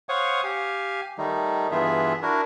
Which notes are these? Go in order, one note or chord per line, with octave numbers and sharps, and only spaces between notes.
C5 C#5 F5 F#5 C#6 D#6
G4 F5 G#5
D#3 G3 A3 D#4
G2 E3 B3 F4 G#4 E5
D4 E4 F#4 A#4